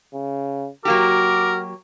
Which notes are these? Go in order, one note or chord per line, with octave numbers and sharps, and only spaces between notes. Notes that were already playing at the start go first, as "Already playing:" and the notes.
C#3
F#3 A#3 F#4 G4 A#4 D6